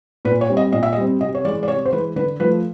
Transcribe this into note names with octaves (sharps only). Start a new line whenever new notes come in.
A#2 B4
C#5
G3 C4
D#5
A#2 D#5
E5
D#5
G3 C4
C3 D#5
C#5
E3 G#3 D5
D5
C3 C#5
C5
E3 G#3 B4
D3 B4
F3 A3 B4